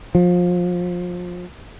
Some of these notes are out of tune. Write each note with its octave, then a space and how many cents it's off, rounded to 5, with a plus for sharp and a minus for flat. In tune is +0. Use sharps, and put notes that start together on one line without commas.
F3 +25